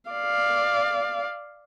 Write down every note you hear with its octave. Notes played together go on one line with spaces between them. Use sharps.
D5 F5